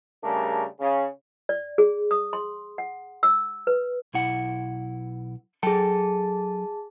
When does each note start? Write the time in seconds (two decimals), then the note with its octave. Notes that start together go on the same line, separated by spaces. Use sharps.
0.24 C#3 G3 A3 D4 G#4 A#4
0.80 C#3
1.49 D5
1.78 G#4
2.11 D#6
2.33 C6
2.78 F#5
3.23 E6
3.67 B4
4.14 B1 E4 F#5
5.63 F#3 G#4 A4 G5 A5